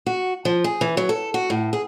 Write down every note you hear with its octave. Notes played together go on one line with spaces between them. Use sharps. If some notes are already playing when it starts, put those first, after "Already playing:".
F#4
F3
G#4
E3
F#3
A4
F#4
A2
G#4